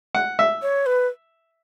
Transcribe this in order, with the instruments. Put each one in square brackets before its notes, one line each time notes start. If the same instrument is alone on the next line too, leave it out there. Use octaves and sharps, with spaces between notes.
[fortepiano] F#5
E5
[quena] C#5
B4